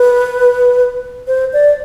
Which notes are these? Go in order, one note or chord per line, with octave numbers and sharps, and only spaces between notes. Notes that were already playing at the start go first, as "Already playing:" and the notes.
Already playing: B4
C5
D5